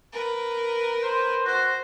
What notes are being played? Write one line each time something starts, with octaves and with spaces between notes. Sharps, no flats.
A#4 B4
C5
F#4 C5